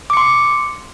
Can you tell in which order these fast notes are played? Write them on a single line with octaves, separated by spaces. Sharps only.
D6 C#7 C6